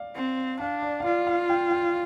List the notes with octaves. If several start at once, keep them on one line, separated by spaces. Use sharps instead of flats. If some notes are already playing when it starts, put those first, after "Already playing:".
Already playing: D5 F5
C4
D4 F5
D5
F5
F4 D5
F5
G5
G5